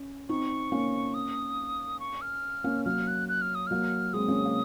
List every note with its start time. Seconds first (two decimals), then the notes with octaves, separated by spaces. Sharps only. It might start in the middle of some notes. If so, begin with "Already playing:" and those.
Already playing: C#4
0.29 C4 D#4 C#6
0.72 A#3 C#4
1.14 D#6
2.00 C#6
2.21 F6
2.64 A#3 C#4
2.85 F#3 A#3 F6
3.07 F#6
3.29 F#6
3.41 F6
3.55 D#6
3.67 F#3 A#3 F6
4.14 G#3 C4 D#6
4.28 A#3 C#4
4.45 A#3